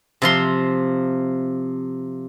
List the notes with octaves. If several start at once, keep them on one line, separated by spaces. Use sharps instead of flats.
C3 F3 C6